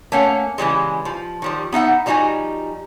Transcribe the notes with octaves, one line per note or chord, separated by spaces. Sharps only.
A3 A#3 C#4 F#5
C#3 E3 G3 G#3
F3
D#3 F3 G3
B3 D#4 E5 F#5
F3 G3 D#4 F4 F#4 G#5